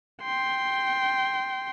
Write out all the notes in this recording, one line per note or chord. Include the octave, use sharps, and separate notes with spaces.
G5 C6